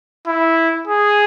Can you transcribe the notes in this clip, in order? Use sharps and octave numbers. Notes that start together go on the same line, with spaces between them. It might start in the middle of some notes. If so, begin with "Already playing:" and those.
E4
G#4